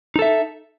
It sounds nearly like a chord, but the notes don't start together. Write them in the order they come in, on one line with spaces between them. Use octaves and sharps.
D#4 A4 E5